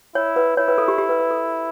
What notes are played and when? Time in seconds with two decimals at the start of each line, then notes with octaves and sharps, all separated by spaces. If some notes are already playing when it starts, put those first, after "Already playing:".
0.15 E4 C#5
0.36 B4
0.57 E4 C#5
0.68 B4
0.78 A4
0.88 G4
0.98 G4
1.09 B4
1.20 B4
1.31 A4